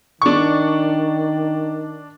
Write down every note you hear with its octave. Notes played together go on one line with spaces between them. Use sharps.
D#3 D4 C#6